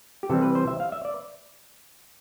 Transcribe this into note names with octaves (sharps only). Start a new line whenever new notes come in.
G4
C3 E3 G3 C4 A4
B4
C5
E5
F5
E5
D5